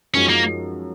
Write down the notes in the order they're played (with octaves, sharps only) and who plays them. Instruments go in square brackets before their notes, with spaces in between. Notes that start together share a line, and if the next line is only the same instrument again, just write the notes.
[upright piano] F#2 F3 G#3 D#4 F#4 [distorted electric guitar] C#4
[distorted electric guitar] A#3